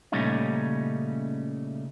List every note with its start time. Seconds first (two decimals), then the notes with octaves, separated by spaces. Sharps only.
0.12 A#2 C#3 G3 A3 C#4 D#4